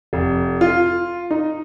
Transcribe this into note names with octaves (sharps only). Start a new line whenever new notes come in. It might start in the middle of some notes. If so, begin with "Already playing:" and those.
F1
F4
D#4